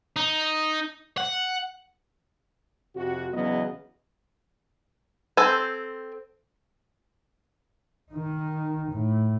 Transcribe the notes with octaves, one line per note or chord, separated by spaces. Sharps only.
D#4
F#5
F2 C3 F#4
E2 C#3 F#3 B3 D#5
C4 A4 C5 G#5
D#3 D#4
A2